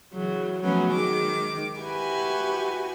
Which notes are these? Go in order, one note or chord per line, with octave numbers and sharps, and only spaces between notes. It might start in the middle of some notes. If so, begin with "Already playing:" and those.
C#3 E3 F#3
F3 F#3 A3 B3 C#4
D#3 G#3 D6
E4 F#4 G4 B4 G#5